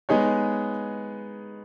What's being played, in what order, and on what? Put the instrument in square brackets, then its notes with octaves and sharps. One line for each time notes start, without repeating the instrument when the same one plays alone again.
[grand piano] G#3 B3 D#4 G#4 C#5